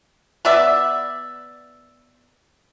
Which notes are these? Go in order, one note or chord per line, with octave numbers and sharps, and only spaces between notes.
B3 D5 E5